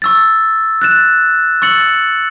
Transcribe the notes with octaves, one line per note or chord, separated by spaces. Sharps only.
C#6 E6 A6
F#6 A6 E7
C#6 E6 A6 C#7 F#7